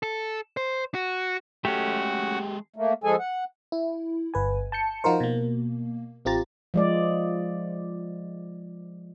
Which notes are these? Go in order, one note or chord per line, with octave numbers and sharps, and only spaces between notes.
A4
C5
F#4
G#3 A3 C#4 F#4 G4 A4
A3 A#3
F3 G#3 G#4 A4 G#5
F#5
E4
G1 B4 G#5
A5 G6 C#7
F3 D#4 F4 F#4 A#4 C5
B2 A#3
A1 C4 F4 G4 A#5 A6
F3 G#3 D5